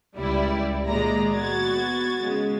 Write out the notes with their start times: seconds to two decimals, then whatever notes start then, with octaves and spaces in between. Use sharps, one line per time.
0.17 C#2 G3 E4 D5
0.87 A#2 D#3 G#3 D5 A#5 A#6
1.33 B3 F#4 G#6 A6
2.22 C#3 G#3